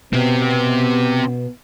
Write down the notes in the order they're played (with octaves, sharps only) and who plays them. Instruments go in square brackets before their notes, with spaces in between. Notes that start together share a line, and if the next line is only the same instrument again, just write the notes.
[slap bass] B2 [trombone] B3 [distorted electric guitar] C4 G4